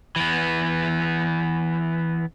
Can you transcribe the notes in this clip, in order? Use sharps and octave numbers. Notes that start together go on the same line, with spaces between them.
E3 B3